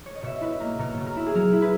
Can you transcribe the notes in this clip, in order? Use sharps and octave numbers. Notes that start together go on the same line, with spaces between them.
C#5
D#5
B2 C#5 E5
E4 B4 D#5
A#3 A#4
B2 A#4 C#5
B2
A#4
E4
G#4
F#3 A#4
E4
G#4 B4